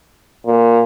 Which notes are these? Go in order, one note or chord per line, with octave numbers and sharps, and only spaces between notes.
A#2